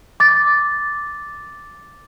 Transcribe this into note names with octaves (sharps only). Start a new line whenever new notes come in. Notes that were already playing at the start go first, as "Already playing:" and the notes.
D6 A6